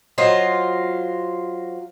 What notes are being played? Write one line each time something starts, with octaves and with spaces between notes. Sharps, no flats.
F#3 F4 C5 D#5